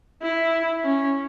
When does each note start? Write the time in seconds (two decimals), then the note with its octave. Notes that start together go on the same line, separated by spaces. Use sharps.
0.22 E4
0.84 C#4